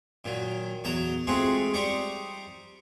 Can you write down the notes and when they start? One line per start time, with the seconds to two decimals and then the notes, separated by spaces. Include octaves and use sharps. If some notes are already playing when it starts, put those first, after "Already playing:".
0.25 A#2 D#3 F#3
0.84 E2 F#3 A5 A#5 D#6
1.27 G#3 A3 C4 F4 F#4 G#4
1.74 G3 D#4 C5 D5 C#6